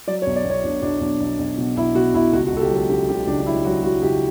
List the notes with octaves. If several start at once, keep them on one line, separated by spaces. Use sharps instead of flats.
F#3 D5
C#5
B1
D5
B1
C#5
B1 D4
B1 D4
B1 D4
B1
B1
B2
B1 E4
B2 F#4
B1 E4
C#2 F#4
F#4
C#2 A4
G4
F#3 A4
C#3 G4
C#3 G4
C#2 D4
D4
F#3 E4
F#3 F#4
F#3 F#4
C#2 G4